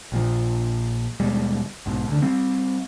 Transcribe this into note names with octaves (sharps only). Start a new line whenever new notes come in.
A#1 A#2 F3
D#2 B2 G3 G#3
B1 G#2 B2
D2 D3
G3 C4